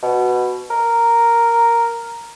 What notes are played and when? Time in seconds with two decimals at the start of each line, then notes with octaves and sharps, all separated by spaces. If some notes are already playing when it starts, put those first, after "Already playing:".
0.03 B2
0.70 A#4